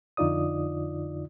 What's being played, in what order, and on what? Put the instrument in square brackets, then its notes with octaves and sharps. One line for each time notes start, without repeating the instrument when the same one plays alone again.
[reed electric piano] F2 D3 D#4 F4 D5 D#6